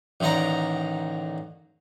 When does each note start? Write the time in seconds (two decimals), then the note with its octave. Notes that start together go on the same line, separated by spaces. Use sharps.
0.20 A1 D3 D#3 F#5 A#5